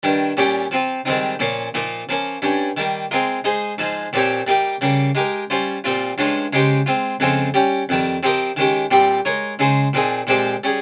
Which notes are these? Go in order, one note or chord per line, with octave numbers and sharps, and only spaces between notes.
G2 D#3 G3
A#2 G3 C#4 G4 C#5
F3 C4 F4
G#2 D#3 G3 C4 D#4
A#2 F3 A#3 C#4
A#2 F3 A#3 D#4
F3 A#3 C#4
G2 G3 C#4
D#3 G3 A#3
G#3 C4 F4 A#4 D#5
G#3 D#4 G#4 C5 D#5
G#2 F3 G#3
A#2 F3 C4 G4 C#5
G3 A#3 D#4 G4
C#3 G3 A#3
G#3 D#4 G4 A#4
G3 C#4 F4 C5
A#2 G3 C4 F4
G2 F3 G#3 C#4 F4
C#3 G#3 D#4 G4 C5
G#3 C4 F4
F2 C#3 G#3 C4 F4
G3 C#4 G4
F2 D#3 G3
F3 C4 G4 A#4 D#5
D#3 G#3 C#4 G4
A#2 G3 C4 G4
G#3 D#4 A#4 C#5
C#3 G#3 D#4 G#4 C5
A#2 F3 C4 D#4 G#4
A#2 F3 G#3 C4 G4
G3 C#4 G#4